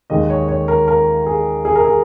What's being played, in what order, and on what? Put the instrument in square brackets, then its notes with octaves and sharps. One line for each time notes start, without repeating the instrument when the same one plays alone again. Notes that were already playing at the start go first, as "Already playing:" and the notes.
[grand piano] D#2 D#3 G#3 D#5
C#5
C#5
A#4
A#4
G#4
G#4
A#4
G#4